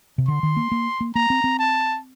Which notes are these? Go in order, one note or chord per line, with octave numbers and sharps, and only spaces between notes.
C3
D3 C6
D#3
A#3
A#3
A#3
A#3 A#5
C4
C4
A5